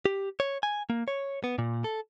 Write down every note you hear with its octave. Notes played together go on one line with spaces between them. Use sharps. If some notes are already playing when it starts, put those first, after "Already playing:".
G4
C#5
G#5
A#3
C#5
B3
A#2
A4